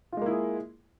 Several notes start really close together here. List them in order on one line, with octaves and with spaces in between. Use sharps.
F4 G#3 A#3 E4 G#4